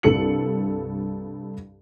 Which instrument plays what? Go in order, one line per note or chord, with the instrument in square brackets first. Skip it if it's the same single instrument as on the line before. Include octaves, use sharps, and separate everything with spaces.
[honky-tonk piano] C2 G2 A4 C#7 F#7